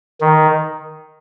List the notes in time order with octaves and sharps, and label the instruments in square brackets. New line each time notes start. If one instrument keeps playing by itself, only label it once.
[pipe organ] D#3